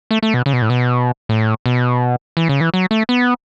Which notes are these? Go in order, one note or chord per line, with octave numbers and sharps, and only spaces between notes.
A3
A3
B2
C#3
B2
A2
B2
A2
B2
E3
C#3
E3
F#3
A3
B3